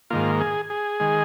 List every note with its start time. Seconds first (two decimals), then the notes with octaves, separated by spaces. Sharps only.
0.10 G#2 D#3 A#3 F4
0.41 G#4
0.70 G#4
1.00 D#3 G#3